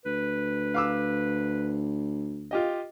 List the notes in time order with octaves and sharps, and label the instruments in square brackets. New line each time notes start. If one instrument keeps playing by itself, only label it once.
[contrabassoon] D2 [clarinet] B4
[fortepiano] F5 D6 E6
F4 G4 D#5